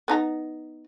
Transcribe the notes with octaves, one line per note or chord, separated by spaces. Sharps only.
B3 D#4 A#5